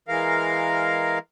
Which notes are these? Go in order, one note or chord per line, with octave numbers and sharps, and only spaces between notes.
E3 G#3 A#4 F5